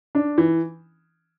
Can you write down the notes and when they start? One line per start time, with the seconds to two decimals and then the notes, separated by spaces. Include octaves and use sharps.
0.15 D4
0.38 E3